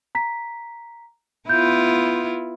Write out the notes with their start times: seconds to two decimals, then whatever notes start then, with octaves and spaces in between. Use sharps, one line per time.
0.15 A#5 B6
1.49 B3 E4 F4 G6